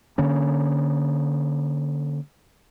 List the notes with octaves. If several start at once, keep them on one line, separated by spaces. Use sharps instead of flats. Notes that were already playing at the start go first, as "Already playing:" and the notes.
D3 A#3 C#4